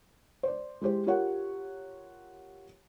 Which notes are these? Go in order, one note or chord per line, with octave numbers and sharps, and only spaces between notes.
C5 D5
G#3 E4 G4 C5
F4 G4 A#4 C#5 F#5